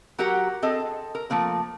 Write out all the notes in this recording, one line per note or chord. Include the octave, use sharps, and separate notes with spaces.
F#3 F#4 G4 A#4 F#5 A#5
C4 G#4 A4 D#5
A#4
F3 A3 A#3 C4